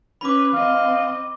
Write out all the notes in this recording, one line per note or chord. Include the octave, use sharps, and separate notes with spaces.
C#4 B4 B5 D6
C4 D#5 F5